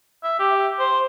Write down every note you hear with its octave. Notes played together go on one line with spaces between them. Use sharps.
E5
G4
C5